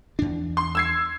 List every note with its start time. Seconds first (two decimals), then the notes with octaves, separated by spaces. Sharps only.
0.19 E2 D4
0.57 C6
0.75 E6 G#6 C7